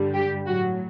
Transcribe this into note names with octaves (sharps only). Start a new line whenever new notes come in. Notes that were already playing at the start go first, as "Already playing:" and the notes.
Already playing: G2 D3 G3
G4
A2 F#3 F#4